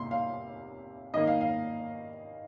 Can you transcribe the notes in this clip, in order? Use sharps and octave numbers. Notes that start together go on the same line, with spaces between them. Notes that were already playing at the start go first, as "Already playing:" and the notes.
Already playing: C3 A#3 C6
F5
D#3 A#3 D#5
F5
F5